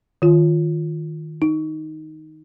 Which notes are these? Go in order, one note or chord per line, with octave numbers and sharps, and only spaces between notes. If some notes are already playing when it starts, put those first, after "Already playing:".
D#3 F4
D#4